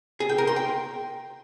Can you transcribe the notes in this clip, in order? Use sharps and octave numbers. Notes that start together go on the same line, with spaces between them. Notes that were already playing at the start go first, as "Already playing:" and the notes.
G#4
G5
A#4
C6
G5